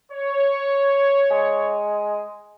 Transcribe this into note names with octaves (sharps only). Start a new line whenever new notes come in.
C#5
G#3